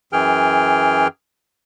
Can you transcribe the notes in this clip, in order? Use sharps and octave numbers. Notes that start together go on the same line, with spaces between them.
F#2 E3 G#4 G5 F6